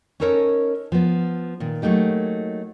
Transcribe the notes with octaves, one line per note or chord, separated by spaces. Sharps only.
C#4 D#4 A4 A#4 C5 C#5
F3 B3
A#2 D#3
F#3 A3 A#3 D#4 G4